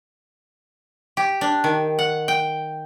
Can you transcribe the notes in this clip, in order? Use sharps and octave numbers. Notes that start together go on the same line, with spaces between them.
G4
D4
D#3
F#5
G5